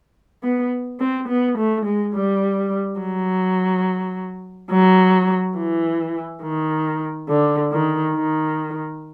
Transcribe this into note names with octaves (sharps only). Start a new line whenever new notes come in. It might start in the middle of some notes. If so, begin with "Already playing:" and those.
B3
C4
B3
A3
G#3
G3
F#3
F#3
E3
D#3
D3
D#3
D#3